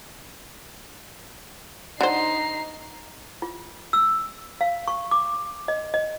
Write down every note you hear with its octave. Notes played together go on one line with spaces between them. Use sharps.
D3 D#4 C5 C7
F4
E6
F5
C#6
D6
D#5
D#5